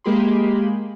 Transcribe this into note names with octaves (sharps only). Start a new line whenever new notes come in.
G#3 A#3 G4 G#4 B5 C6